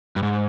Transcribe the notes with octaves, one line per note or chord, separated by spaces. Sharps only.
G2
G#2